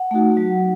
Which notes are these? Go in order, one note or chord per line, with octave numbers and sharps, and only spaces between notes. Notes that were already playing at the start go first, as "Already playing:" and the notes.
Already playing: F#5
A3 D#4 F#4
F#3